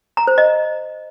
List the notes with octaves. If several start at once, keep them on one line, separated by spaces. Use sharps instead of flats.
A#5
C5
D#5